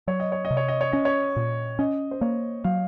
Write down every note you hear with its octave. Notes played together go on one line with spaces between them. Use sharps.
F#3 C#5
D#5
C#5
D#5
C3
C#5
D#5
C#5
C#4 D#5
C#5
A#2
C#4 D#5
C5
A#3 C#5
F#3 F5